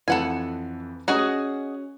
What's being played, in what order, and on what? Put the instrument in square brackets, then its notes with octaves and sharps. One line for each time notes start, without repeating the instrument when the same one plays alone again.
[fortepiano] F2 E3 [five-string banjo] A4 F#5 G#5
[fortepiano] C#4 F#6 [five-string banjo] F#4 G#4 D#5